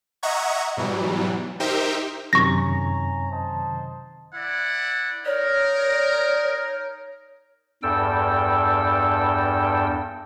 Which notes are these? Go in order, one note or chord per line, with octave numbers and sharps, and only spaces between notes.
D#5 E5 F#5 A#5 C#6 G#6
G#2 B2 E3 F#3 G3
D#4 G4 A#4 C5 E5 G5
F#2 C3 D#3 C#5 G#5 A#5 C#6 A#6
C5 D#5 A5
E4 D5 F#5
D#4 A#4 C#5 D5
E2 G2 A4 G5 E6